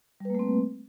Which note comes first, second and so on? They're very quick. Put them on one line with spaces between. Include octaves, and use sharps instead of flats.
G3 B4 A#3 A3 C4